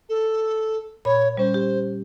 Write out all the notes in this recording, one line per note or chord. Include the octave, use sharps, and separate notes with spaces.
A4
A#2 C#5 B5
G3 C#4 C5
G4